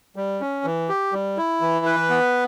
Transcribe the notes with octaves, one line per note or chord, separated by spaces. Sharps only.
G3
C#4
E3
G4
G3
E4
E3
B4
B3